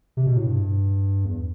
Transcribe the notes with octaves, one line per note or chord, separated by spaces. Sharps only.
C3
B2
A2
G2
E2